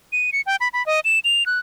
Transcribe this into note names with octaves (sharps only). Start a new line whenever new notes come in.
D#7
C#7
G5
B5
B5
D#5
E7
F7
F#6